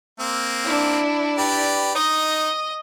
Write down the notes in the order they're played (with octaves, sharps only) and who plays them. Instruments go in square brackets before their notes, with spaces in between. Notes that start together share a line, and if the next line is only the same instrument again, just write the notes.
[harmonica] A#3 C4
[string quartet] D4 E4
[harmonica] G4 B4 D5
[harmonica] D#4 [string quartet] D#5